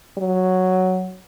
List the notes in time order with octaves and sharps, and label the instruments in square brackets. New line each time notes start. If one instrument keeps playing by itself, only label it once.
[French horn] F#3